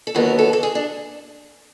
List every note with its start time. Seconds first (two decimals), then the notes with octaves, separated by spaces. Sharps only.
0.07 A4
0.15 D#2 D3 F#3 B3 A#4
0.39 A4
0.53 A4
0.63 G#4
0.75 D4